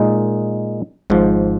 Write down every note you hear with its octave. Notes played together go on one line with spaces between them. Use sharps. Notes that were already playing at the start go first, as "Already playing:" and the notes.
Already playing: A#2 G#3 D#4
G#1 G#2 F3